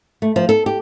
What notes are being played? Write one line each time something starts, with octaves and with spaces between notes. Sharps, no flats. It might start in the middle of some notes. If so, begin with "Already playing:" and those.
A3
F3
A4
G4